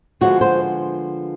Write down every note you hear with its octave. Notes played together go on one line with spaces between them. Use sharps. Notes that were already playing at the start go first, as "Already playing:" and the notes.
D3 F3 G#3 B3 F#4
C5